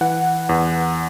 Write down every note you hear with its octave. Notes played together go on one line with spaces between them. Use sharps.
E3 F#5
E2